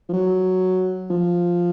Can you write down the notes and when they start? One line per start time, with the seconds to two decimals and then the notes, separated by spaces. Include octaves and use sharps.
0.09 F3
0.13 F#3
1.10 F3